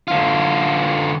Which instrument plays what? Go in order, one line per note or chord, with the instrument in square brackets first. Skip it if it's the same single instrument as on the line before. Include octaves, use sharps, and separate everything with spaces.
[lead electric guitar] D3 F4